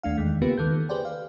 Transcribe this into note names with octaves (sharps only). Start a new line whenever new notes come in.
D#2 A3 D4 F5
E2 D#3 G#3
C#3 A#3 B3 F4 G4 B4
D#3 A4 G6
G4 G#4 B4 C5 D5 G5
F5